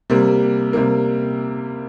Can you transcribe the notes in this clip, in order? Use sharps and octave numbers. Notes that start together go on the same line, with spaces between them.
C3 G3 A#3
C3 G3 A#3